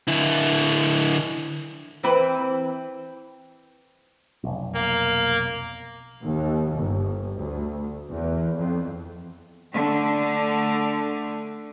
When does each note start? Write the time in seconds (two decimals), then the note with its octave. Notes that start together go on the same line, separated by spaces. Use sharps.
0.07 D3 E4
2.03 E3 C4 B4
4.44 F1 B1
4.75 A#3
6.22 D#2
6.74 G1
7.37 D2
8.10 E2
8.56 F2
9.73 D3 A3